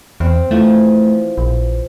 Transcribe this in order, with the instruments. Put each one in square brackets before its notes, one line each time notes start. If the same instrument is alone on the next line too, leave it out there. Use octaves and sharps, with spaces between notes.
[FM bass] E2 [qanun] C4
[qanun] E3 F3 [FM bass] A3
[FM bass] A#1